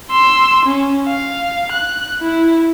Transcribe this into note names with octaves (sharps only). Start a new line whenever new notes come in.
C6 E6
C#4
F5
F#6
E4